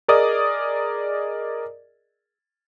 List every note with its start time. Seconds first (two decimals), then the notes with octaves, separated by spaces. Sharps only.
0.08 G#4 A#4 D5 D#5 D#6